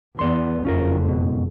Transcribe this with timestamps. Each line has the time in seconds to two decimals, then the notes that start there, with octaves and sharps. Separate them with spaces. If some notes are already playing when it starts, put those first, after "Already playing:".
0.19 E2 B3 D5 C6
0.65 F#1 F2 C#4 F4 A#4
1.04 G#2 B2